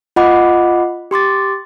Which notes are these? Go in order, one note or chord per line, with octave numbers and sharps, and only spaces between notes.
F4 D#5 F#5 B5 D6
G4 C6 D6 A6